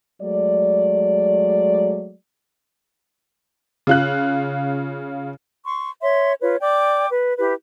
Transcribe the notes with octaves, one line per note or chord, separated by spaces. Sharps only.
F#3 G#3 A3 D5
C#3 F4 F#6
C6 C#6
C#5 E5 C6
F4 B4 C#5
D5 G5 D6
B4
E4 G4 B4